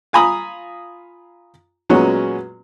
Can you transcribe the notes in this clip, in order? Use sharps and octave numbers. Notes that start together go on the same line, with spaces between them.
F4 F5 G#5 A#5 B5 D#6
A#2 F#3 G#3 B3 C#4 F#4